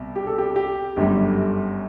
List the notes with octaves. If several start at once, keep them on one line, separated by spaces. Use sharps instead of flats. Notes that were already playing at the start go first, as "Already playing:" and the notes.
Already playing: C2 B2
G4
A4
G4
G4
G1 F#2 D3 G3 G4